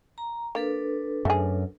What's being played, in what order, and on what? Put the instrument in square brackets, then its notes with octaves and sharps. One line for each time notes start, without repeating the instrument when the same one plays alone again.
[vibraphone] A#5
[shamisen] A#3 [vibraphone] D4 A4 B4
[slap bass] F#2 [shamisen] A3 G#4